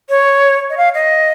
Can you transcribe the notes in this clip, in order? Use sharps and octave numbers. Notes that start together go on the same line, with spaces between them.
C#5
D#5
F5
D#5